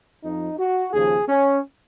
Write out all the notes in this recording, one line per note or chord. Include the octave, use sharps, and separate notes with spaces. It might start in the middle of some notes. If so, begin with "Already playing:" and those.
F2 F3 D#4
F#4
D#2 C#3 F3 G#4
C#4